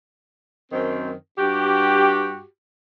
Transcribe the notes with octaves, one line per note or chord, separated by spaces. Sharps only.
F#2 D#3 C4
G2 F#4 G4